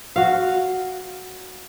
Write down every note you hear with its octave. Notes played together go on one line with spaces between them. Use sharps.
F#4 F5